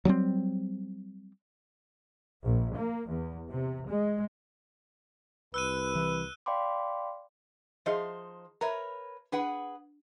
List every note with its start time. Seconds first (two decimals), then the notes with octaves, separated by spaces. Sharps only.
0.05 F#3 G3 A#3 C4
2.43 A#1
2.77 A#3
3.08 E2
3.49 C3
3.89 G#3
5.54 C2 B4 E6 F#6 D#7
5.95 E3
6.46 D5 F5 G5 B5 C6 D6
7.86 F3 D#4 G#4 C5 D#5 E5
8.61 A#4 B4 C#5 E5 A#5
9.32 D4 G#4 B4 F#5